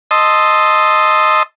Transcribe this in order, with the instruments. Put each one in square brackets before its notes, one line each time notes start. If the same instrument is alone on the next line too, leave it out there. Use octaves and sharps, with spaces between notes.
[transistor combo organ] D#5 A5 C6 D#6 E6